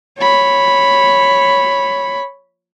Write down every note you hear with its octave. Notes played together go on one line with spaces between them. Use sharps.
C#5 B5